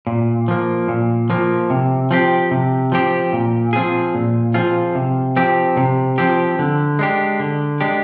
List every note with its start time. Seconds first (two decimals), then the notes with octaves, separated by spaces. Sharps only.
0.07 A#2
0.48 F3 A#3
0.88 A#2
1.30 F3 A#3
1.70 C3
2.11 F3 C4 G4
2.51 C3
2.92 F3 C4 G4
3.33 A#2
3.73 F3 C4 F4 G#4
4.15 A#2
4.54 F3 C4 F4 G#4
4.95 C3
5.36 F3 C4 G4
5.77 C3
6.18 F3 C4 G4
6.59 D3
6.99 G#3 D4 G4
7.40 D3
7.81 G#3 D4 G4